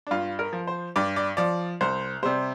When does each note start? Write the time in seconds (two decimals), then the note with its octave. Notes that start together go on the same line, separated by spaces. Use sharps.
0.07 D4
0.11 G2 F4
0.39 A#4
0.53 F3
0.67 C5
0.96 G2 D5
1.16 D5
1.37 F3 D5
1.81 C2 C5
2.23 C3 G3 C5